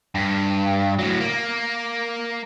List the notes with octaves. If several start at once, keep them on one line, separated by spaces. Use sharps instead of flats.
G2
A2 F#3
A#3